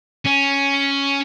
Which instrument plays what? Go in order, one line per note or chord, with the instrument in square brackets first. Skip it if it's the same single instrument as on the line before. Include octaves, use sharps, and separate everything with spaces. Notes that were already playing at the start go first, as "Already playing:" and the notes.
[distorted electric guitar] C#4